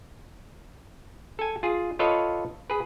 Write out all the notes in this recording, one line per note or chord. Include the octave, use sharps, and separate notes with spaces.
A4 G#5
F4 G#4
F4 A4 B4 C#5 D#5 F5
G#4 B4